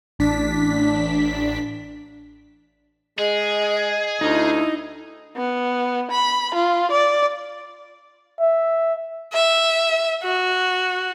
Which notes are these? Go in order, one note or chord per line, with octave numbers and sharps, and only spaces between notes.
A1 D4 B6
G#3 G#4 D#5
D2 D#4 E4
B3
B5
F4
D5
E5
E5
F#4